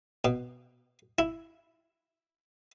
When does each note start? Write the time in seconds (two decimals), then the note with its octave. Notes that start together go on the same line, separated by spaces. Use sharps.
0.25 B2
1.19 E4